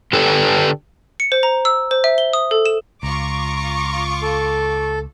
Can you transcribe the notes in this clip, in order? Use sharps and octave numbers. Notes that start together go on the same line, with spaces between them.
D3 D4 G4 A4 B4
C#7
C5
A#5
E6
C5
E5
G7
D#6
A4
E7
C#2 F4 A#5 C#6 D6
A4